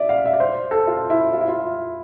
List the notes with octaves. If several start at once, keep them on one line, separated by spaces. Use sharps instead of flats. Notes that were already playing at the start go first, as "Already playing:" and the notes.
Already playing: D5 E5
F5
E5
D5
C5
A4
F4
E4
F4
E4
F4